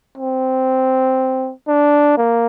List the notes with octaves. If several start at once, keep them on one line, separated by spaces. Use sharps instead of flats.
C4
D4
A#3